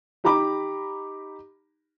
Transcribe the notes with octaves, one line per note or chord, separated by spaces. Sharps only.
D#4 G4 A#5 B5 D6